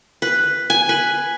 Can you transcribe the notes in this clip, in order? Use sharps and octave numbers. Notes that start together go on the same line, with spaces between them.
B4
G#5
B4